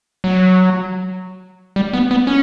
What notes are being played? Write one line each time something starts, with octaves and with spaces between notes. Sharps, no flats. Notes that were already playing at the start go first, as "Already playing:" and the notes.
F#3
G3
B3
B3
C#4